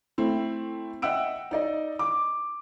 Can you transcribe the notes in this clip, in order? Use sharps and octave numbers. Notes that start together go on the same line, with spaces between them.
A3 C4 E4
D#5 E5 F#5 G5 E6 D7
D#4 D5 D#5
D6